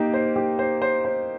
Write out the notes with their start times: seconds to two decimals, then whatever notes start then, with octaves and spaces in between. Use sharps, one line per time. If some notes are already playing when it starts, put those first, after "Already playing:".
Already playing: A#3 D#4 G4
0.14 C5
0.36 G4
0.59 C5
0.82 C5
1.05 C5